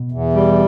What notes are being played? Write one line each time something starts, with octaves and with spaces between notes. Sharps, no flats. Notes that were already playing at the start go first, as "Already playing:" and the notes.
Already playing: B2
E2
G3